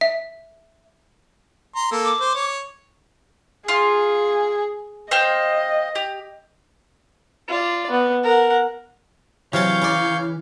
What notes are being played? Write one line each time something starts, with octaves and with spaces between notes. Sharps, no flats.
E5
A#5 C6
A#3 A4
D6
C5
C#5
F4 G#4
C5 D#5 F5 G5
G4
F4 D5
B3
A#4 F#5
C3 E3 F#3 C#5 F5 A5 G6
C#3 D5